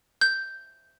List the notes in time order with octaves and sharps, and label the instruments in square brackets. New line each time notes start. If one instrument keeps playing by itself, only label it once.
[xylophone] G6